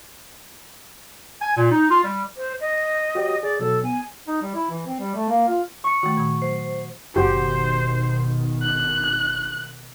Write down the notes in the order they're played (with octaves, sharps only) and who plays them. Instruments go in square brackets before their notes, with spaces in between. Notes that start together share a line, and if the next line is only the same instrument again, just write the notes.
[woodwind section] G#5
A#2
D#4
F4
G3
[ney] C5
D#5
[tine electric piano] F#4 G4 C#5
[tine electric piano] G#4 [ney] D5
[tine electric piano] B2 F#3 [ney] A4
[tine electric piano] B3 [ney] G#5
[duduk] D#4
G3
E4
E3
C4
G3
A3
A#3
F4
[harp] C#6 C#7
[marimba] D#3 A3 [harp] F#4
[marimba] A#2 D#3 [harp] G#6
[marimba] F#3 [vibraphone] C5
[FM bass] F#1 [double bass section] B2 D#3 [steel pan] F#4 G4 [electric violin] C5
[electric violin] F#6